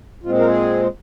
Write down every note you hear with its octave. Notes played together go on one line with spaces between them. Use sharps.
A#2 G#3 C4 F4
A#4
G#4